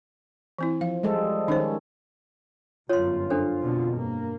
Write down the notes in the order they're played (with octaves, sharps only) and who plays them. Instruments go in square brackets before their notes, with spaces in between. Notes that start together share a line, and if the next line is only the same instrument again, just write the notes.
[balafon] E3 C4 E4
[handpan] F3 [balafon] F5
[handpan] G3 G#3 A4
[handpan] D#3 C#4 [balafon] D#4 C5
[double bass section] G1 F#2 [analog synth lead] F4 [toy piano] C#5 C6
[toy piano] D4 A4 C5
[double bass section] F2 B2 D3
[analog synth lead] G2 [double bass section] A#3